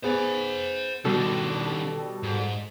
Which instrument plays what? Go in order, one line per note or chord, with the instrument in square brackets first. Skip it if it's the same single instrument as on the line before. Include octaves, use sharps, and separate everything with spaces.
[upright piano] B3 G#4 [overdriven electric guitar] C5 F#5
[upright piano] B2 [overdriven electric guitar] D#3 D4 [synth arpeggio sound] G3 A4
[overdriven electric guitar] G#2